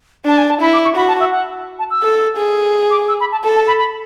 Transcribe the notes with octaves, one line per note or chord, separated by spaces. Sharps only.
D4 A5
G#5
A5
E4 B5
D6
C#6
F#4 B5
A5
E5
F#5
A5
E6
A4
G#4
D6
E6
B5
A5
A4 A5
A5
B5
B5